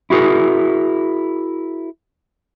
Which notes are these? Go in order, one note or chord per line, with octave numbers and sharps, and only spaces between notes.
E4 F#4 G#4 A#4